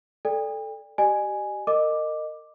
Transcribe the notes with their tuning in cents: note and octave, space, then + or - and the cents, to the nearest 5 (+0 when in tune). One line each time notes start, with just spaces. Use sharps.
A4 +0 D5 +0 G5 +40
G4 -30 D#5 -45 G#5 +0
A#4 -30 D#5 -15 D6 +0